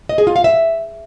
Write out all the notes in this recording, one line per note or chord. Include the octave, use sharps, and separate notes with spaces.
D#5
G#4
F4
F5
E5